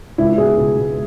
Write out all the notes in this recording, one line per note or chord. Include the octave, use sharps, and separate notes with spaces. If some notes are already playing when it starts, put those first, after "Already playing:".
C#2 E4
B2 G#4
C#2
B2